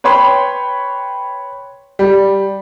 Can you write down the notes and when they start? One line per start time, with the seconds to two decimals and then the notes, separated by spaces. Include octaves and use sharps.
0.04 B4 C#5 G5 B5 C6
1.99 G3